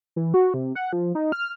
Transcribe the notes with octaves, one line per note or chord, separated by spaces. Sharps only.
E3
F#4
C3
F#5
F3
D#4
F6